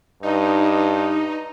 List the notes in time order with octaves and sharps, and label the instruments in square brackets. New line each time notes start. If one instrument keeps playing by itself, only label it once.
[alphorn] G2 [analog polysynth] D#4